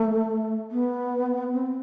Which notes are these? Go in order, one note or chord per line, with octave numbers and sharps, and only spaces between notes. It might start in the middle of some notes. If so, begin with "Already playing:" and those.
Already playing: A3
B3
C4